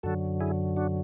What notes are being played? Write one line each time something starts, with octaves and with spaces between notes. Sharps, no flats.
F#2 D3 F#3 F#4 A4
E4 G#4
D4 F#4